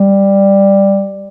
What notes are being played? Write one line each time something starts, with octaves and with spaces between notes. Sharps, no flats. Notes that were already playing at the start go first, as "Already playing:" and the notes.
Already playing: G3